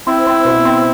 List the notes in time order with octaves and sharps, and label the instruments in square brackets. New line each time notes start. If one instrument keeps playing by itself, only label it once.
[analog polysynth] C4 [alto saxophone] E4
[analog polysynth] C4
B2
C4